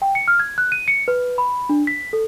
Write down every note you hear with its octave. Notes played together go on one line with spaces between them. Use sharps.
G5
C#7
F6
G#6
F#6
D#7
C#7
B4
B5
D4
B6
A4